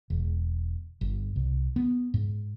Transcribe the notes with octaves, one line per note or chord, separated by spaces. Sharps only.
E1
G1
C2
B3
G#2